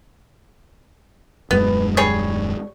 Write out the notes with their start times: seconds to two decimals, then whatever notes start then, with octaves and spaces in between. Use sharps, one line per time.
1.51 D#1 F#2 G#3 B3
1.97 G3 G#4 C#5